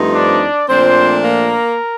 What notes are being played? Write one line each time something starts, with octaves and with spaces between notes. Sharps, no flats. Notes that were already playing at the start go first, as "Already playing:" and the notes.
Already playing: G2 F3 A3 C4 D#4
D4 D5
A#2 F3 A3 C4 D4 C5
A#3 A#4